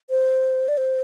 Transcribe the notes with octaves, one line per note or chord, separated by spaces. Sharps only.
C5
D5
C5